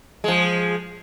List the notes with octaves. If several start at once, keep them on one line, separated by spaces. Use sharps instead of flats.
F3 G#3